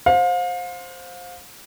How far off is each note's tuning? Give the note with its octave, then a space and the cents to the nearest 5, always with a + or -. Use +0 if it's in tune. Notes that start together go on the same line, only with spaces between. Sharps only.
C5 +0 F5 +35